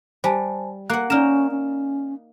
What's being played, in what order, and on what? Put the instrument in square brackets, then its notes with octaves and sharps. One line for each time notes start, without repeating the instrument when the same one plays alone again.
[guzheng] G3 [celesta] C5 G#5 A5
[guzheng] A#3 F#5 [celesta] F#6
[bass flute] C#4 [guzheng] D#4 A#4 [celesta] D5 F6 E7
[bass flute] C#4